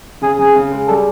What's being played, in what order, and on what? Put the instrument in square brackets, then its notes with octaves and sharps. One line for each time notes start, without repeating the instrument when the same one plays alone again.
[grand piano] C#3 [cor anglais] G#4
[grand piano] C#3 [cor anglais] G#4
[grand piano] C#3
G#3
[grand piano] G3 [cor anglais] A4